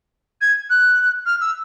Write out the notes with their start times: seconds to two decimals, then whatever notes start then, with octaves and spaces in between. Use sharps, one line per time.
0.41 G#6
0.70 F#6
1.26 F6
1.41 E6